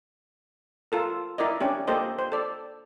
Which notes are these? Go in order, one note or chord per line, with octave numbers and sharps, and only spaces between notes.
F4 A4 A#4
E4 A#4 D5 D#5
C#4 D4 G4
A#3 G4 A4 C5 D#5
C5
A4 D5